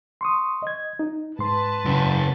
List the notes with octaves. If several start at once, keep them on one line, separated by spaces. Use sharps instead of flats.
C6 C#6 D#6
D#5 G#6
D#4
G#2 B4 A5 C6
F#2 C#3